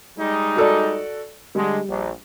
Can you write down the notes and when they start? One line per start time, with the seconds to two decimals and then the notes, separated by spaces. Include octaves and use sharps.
0.18 G3 G#3 D#4
0.56 F#4 A4 D5
1.55 D3 G3 G#3
1.89 A#1